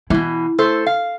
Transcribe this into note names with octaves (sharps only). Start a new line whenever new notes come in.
B2 E3 E4
A3 A4 C5
F5